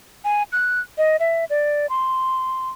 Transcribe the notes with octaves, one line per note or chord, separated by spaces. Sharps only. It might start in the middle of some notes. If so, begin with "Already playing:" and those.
G#5
F#6
D#5
E5
D5
C6